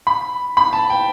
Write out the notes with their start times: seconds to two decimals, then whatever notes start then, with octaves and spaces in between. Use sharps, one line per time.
0.07 B5
0.57 B5
0.73 A5
0.90 G5